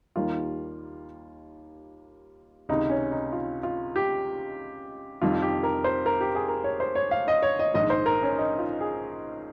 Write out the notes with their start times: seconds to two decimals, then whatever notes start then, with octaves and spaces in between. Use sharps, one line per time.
0.16 D#2 D#3 G3 A#3 F4
2.69 C#2 C3 D#3 D#4
2.90 C#4
3.12 D#4
3.33 F4
3.63 F4
3.96 G4
5.22 F1 F2 D#3 G3 F4
5.42 G4
5.63 A#4
5.84 C5
6.06 A#4
6.21 G4
6.35 G#4
6.48 A#4
6.64 C#5
6.80 C5
6.95 C#5
7.11 F5
7.28 D#5
7.43 C#5
7.59 D#5
7.74 A#1 G#2 D#3 D#5
7.90 C5
8.06 A#4
8.23 C#4
8.38 D#4
8.59 F4
8.81 G#4